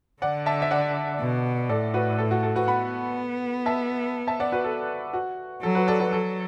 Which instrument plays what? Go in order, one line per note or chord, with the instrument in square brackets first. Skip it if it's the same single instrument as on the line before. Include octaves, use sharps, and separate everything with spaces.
[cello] D3 [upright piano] D5 F#5
[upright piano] E5 A5
E5
D5 F#5
[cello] B2
[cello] A2 [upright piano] A4 D5
[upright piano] F#4 B4
A4
F#4
A4
F#4 B4
[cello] B3 [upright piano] F#5 B5
[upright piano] E5 A5
E5 A5
D5 F#5
F#4 B4
A4
F#4
[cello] F#3 [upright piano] A4
[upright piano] F#4 B4
A4 D5
F#4 B4
[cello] F#3 [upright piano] A4